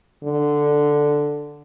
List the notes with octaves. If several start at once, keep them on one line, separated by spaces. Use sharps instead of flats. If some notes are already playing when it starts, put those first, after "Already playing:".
D3